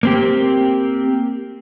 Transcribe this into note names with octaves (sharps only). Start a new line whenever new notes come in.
A#3 C4 G4